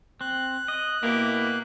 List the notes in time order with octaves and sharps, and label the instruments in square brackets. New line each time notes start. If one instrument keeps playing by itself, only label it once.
[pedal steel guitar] C4 [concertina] F#6
[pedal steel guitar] D#5
[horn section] B2 A#3 [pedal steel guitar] E4 G4